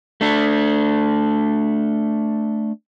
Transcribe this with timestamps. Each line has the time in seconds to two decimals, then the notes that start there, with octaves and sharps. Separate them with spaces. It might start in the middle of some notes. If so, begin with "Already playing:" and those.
0.21 A3 D4